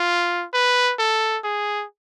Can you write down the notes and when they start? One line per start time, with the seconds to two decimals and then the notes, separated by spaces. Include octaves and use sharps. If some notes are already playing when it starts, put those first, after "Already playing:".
Already playing: F4
0.53 B4
0.99 A4
1.44 G#4